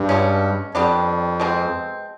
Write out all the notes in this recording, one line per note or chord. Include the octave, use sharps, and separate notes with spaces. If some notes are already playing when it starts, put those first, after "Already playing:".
Already playing: G2
B2 G#3 C#4
F2 G3 B3 D4
B2 G#3 C4